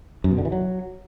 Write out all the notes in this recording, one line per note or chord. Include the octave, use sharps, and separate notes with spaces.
F#2
B2
D3
E3
F#3